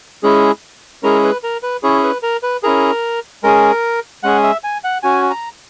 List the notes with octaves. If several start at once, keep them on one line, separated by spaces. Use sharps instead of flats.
G#3 C#4 E4 G#4
G#3 C#4 E4 G#4 A#4
B4
A#4
B4
C#4 E4 G#4 C#5
B4
A#4
B4
C#4 E4 G#4 A#4
G#3 C#4 G#4 A#4
G#3 C#4 G#4 F#5
E5
G#5
F#5
C#4 F#4 G#5
A#5